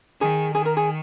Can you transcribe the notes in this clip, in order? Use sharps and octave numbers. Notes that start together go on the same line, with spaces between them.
D#3 G#4
D#3 G#4
A#4
G#4